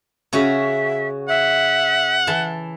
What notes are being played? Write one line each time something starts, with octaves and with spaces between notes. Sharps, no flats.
C#3 C#4 F#4 E5
E5 F#5
E3 A5